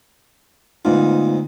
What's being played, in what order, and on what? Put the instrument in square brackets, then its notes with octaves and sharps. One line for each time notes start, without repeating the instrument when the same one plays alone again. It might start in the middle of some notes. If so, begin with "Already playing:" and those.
[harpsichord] D2 G#2 [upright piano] B3 D#4 F4